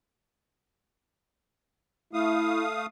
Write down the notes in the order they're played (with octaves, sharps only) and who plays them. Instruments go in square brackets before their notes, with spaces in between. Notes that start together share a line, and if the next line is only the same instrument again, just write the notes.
[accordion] A3 F5 D#6 [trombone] E4